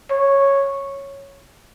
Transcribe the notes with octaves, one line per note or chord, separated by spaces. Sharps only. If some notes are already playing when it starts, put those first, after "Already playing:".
C#5